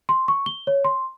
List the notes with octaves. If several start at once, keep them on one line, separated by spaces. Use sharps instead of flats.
C6
C#6
G7
C#5
C6